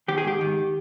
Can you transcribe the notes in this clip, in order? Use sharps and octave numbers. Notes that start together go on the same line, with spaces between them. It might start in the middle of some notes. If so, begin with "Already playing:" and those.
D#3 G4
G#4
G#2 G4
D#3